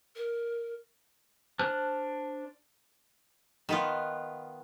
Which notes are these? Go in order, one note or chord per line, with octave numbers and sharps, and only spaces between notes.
A#4
D4 C5 A5 F6 F#6
D#3 B3 F4